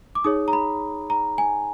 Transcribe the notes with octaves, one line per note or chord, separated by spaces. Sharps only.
D6
D#4 G#4 C#5 D#6
A#5
B5
A#5
G#5